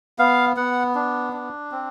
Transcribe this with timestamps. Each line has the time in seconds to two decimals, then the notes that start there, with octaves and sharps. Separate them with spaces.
0.19 B3 F5
0.57 B3 F#5
0.95 D4
1.33 D4
1.72 C4